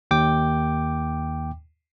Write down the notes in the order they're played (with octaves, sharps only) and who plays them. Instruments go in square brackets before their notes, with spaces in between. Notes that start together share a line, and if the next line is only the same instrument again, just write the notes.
[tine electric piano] D#2 G5 D6